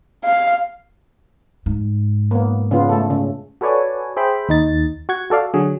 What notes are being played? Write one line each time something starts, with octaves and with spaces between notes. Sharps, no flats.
F5
G#2
A#3 B3
C#3 B3 F4
A3 A4
C#3
F#4 A4 B4 C#5 D5 G#5
G#4 C5 E5 G5 B5
D#2 D#4 A6
F#4 F#5 G#6
F#4 A4 D5 F5
D3 F#3 F#4 G#4